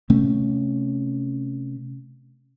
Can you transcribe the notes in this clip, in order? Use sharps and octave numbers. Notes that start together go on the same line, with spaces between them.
C3 A3 C#4